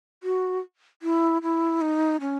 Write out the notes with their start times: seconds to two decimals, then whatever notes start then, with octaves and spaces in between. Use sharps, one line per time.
0.23 F#4
1.02 E4
1.42 E4
1.81 D#4
2.21 C#4